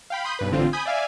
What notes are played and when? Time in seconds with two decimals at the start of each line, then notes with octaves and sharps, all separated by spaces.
0.10 F5 G5 B5
0.24 B5 C6 D#6 G6
0.39 B1 G2 B4
0.51 A1 D3 C4 F4
0.73 G#5 B5 D#6 G6
0.85 D5 E5 F5 G#5